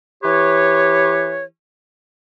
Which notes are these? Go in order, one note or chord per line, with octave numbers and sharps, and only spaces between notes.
E3 G4 B4 C#5